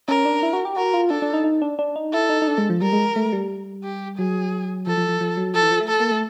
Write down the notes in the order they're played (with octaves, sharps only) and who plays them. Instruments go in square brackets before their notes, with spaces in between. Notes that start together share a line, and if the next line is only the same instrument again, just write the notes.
[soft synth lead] C#4 [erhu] A#4
[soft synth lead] D4
E4
F#4
G4
[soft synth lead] F#4 [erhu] A#4
[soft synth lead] F4
[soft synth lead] D4 [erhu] A4
[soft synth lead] D4
D#4
D#4
D4
D4
D#4
[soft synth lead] E4 [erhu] A4
[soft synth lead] D#4
D#4
D4
G#3
F3
[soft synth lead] G3 [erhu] A#4
[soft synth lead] G#3
A3
G3
[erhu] G4
[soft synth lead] F#3 [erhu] G#4
[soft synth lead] F3 [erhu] A4
[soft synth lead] F3
F3
F3
F#3
[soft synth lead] F3 [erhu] A4
[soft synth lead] E3
F3
A3
[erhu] A4
[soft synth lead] A#3
A3